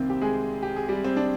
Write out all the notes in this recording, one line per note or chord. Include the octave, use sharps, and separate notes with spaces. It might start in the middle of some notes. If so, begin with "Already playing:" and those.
Already playing: C2 C3 D#3 A#3 C4 C5
G4
G#3 G#4
G4
G#4
G3 G4
C4
D4